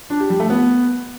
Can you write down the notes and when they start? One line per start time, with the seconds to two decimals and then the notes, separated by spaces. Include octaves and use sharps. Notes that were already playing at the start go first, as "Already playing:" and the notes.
0.10 D4
0.20 G4
0.30 G3
0.40 A3
0.50 B3